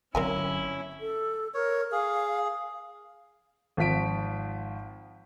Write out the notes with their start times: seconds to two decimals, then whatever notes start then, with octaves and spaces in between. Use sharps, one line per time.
0.15 G1 D3 F#3 C4 C#4 E4 A#4 G#5
1.00 A4
1.54 A#4 C#5
1.92 G#4 F5
3.77 G#1 F3 F4 B6 D7